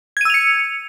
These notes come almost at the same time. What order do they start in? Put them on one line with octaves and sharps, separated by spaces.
G#6 D#7 E6 F7 C#7